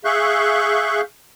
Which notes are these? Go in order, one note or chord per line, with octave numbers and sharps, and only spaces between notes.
G#4 E5 F5 C#6 F#6 G6